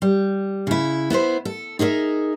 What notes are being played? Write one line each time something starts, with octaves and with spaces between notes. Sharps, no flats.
G3
C#3 E4
B3 E4 A#4 C5
A4
D#4 G#4 A#4 C#5 E5